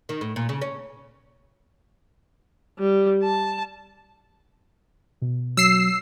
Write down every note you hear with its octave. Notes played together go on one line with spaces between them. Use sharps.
D#3
A2
A#2
C#3
C#4
G3
A5
B2
F#3 E6 C7